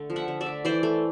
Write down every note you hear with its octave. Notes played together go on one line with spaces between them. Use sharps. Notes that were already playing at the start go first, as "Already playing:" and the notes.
Already playing: D3 A3
F3
E5 F#5
D3
D5 E5
A3
E3 C5 D5
A3